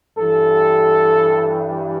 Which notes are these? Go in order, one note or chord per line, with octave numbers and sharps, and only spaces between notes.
G2 E3 G3 A4